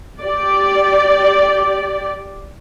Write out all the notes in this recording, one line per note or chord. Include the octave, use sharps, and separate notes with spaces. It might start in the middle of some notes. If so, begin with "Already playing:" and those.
G4 D5